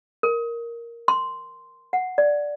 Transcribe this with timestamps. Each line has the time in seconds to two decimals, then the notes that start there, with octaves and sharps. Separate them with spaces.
0.23 A#4
1.08 C6
1.93 F#5
2.18 D5